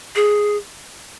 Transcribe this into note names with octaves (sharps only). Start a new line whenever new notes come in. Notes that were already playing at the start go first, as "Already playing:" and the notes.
G#4